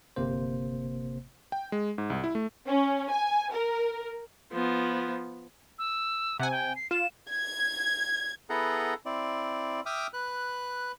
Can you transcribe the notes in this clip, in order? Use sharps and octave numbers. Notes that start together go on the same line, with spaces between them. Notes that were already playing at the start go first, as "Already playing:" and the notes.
G1 C3 A#3 C5
G5
G#3
G#2
C2
E4
A3
C#4
G#5
A#4
F3 B3
E6
C3 F#5 G#5
G5
C7
F4 E7
G#6
B3 E4 G#4 A4 F#5 A#5
C4 E4 D5
E5 G5 D6 D#6 F6
B4 F#6